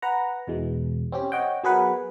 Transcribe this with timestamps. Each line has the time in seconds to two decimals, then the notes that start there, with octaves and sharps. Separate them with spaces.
0.02 B4 F#5 A#5
0.47 E2 B2 E3 G#3
1.12 C4 C#4 G4
1.32 C#5 D#5 F#5 G5
1.64 F#3 B3 G#4 A#4 B4 F#5